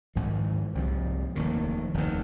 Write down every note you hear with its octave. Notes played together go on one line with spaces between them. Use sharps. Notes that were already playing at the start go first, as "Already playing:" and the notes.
G#1 G#2 F3
C2 C3 F3
F1 D#2 D#3
F1 D#2 D#3